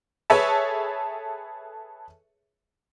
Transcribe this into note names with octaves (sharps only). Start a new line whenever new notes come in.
G#4 A4 B4 C#5 E5 A5